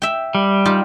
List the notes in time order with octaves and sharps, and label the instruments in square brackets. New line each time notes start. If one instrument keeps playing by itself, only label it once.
[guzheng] E5 G5
[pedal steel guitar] G3
[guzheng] D#4 F4 G4